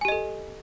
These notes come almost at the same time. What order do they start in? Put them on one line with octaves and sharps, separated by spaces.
G#5 G4 D#5 A4